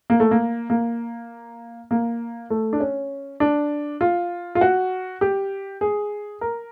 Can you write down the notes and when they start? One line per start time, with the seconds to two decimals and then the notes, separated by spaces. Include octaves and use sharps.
0.10 A#3
0.20 A3
0.31 A#3
0.70 A#3
1.91 A#3
2.50 A3
2.73 D4
2.80 C#4
3.40 D4
4.01 F4
4.55 F4
4.61 F#4
5.21 G4
5.81 G#4
6.41 A#4